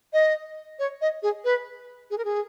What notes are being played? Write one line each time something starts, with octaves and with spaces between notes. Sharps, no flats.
D#5
C#5
D#5
G#4
B4
G#4
A#4
G#4